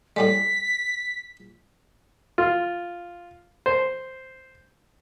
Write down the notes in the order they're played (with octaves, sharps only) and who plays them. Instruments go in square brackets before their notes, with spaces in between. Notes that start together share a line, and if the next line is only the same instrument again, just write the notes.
[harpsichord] A2 G3 G#3 [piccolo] B6
[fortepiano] F4
C5